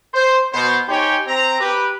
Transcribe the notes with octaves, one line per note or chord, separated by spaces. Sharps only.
C5
B2 B3 C5
D#4 G4 C5 C#5 G5 G#5
C4 A#5
G4 B4